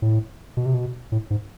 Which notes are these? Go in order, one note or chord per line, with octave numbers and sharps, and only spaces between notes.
A2
B2
C3
B2
A2
G#2